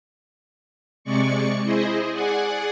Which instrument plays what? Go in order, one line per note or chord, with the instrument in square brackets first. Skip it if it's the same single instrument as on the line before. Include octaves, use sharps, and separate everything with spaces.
[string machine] C3 G#3 D5 C#6 C#7
E4 G#4 C5 D#5
G#4 D5 F#5 G#5